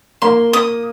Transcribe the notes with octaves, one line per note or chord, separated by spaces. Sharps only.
A#3 C6
D#6